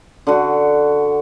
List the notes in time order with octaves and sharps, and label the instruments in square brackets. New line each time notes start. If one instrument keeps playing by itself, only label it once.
[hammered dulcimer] D3 F#4